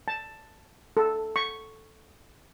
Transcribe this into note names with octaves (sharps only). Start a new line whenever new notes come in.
A5
A4
C#6